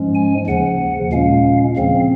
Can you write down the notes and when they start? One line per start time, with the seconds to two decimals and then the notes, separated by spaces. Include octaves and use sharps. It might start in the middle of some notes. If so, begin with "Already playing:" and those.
Already playing: G#2 F3 G#3 C#4
0.15 G#5
0.47 D#2 C#3 F3 F#5
1.12 A#2 G#3 C#4 F5
1.77 D#2 C#3 F3 C4 F5